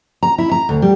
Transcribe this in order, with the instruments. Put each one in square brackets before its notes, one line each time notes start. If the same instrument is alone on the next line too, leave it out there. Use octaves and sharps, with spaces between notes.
[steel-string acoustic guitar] A#5
E4
A#5
D2
G3